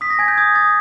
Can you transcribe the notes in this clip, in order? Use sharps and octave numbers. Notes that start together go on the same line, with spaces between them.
D#6 B6
A#6
G#5 G#6
G6
D#6 G#6
D#6 A6